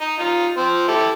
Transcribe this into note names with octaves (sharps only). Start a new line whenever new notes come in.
D#4 D#5
D#4 F4
F3 C4 C6
E4 G4 A4